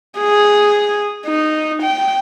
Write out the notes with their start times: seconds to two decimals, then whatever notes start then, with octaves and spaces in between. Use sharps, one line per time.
0.19 G#4
1.26 D#4
1.83 G5